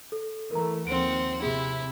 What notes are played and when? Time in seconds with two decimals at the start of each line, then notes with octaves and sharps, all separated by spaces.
0.12 A4
0.51 E3 A3 A#4 A#5
0.87 D#2 F3 C4 F#5 D7
1.42 C3 C4 E4 G#4